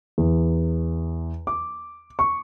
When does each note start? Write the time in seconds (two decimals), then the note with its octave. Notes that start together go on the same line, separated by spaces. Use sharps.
0.18 E2
1.47 D6
2.19 C#6